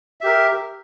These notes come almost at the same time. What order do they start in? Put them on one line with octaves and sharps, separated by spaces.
E5 G4 A#4